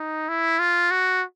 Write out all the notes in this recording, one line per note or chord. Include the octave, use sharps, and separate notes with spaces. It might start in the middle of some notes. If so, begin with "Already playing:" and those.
Already playing: D#4
E4
F4
F#4